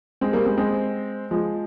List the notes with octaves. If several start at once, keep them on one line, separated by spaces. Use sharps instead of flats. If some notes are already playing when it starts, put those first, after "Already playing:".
G#3 C4
G3 A#3
G#3 C4
G#3 C4
F3 G#3